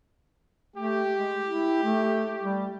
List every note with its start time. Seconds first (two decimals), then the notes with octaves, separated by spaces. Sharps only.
0.77 A3 G4
1.15 G#3
1.46 E4
1.83 A3
2.42 G3